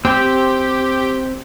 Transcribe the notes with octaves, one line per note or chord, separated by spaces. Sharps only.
C4 G4 G5